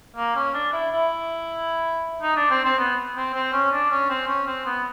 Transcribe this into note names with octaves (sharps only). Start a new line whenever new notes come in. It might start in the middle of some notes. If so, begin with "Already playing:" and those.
A#3
C#4
D4
E4
E4
D#4
D4
C4
C4
B3
C4
C4
C#4
D4
C#4
C4
C#4
C4
B3